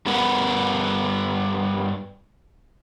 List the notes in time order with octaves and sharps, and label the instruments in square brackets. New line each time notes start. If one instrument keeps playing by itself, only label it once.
[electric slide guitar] G2 G3 B3 A#4 B4 F#5